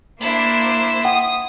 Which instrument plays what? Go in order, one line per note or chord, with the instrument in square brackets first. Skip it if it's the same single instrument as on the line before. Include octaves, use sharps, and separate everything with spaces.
[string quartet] A#3 C5 [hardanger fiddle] D4 E4
[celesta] F#5 G5 [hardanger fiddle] D#6